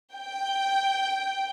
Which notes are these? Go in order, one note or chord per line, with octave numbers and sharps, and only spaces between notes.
G5